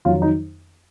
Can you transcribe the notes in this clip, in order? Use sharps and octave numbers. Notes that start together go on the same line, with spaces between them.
F2 D#3 F#3 F4
D#4